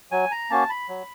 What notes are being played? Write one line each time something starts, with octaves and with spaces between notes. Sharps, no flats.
F#3 G#5
A#5
A#3 C#4 F#4 A5
B5
F#3